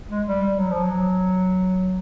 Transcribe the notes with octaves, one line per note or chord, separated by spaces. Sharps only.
G#3
G3
G3
F#3
F3
F#3